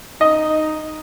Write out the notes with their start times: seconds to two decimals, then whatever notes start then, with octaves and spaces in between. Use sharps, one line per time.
0.21 D#4 D#5